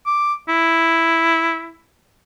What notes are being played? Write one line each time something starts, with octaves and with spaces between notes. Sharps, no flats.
D6
E4